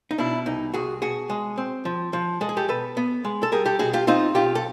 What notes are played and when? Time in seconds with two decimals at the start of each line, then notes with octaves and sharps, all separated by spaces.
0.11 D#4
0.18 B2 D4 E4
0.46 C2 D#4
0.74 C2 F#4 G#4
1.02 B2 F#4 G#4
1.30 G#3
1.58 C4
1.85 F3
2.13 F3
2.41 G#3 A4
2.49 G#4
2.57 G4 A4
2.68 B2 A4 B4
2.97 B3
3.25 G#3
3.43 A4
3.52 G3 G#4 A#4
3.66 G4 A4
3.79 B2 F#4 G#4
3.93 F4 G4
4.07 C4 D#4 F4
4.35 B1 F4 G4
4.55 A4